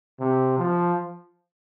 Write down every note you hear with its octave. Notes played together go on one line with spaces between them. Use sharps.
C3
F3